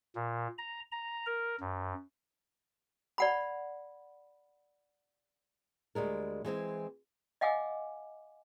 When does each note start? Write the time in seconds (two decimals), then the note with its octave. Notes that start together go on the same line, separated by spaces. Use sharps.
0.15 A#2
0.58 A#5
0.92 A#5
1.26 A#4
1.60 F#2
3.18 D5 F#5 B5
5.95 D2 G3 G#3 A#4
6.45 E3 G#3 C4 G#5
7.41 D#5 F5 F#5 G#5 D6 E6